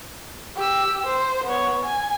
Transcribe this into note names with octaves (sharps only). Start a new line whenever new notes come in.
G4 E6
C5
B3 C#5
G#5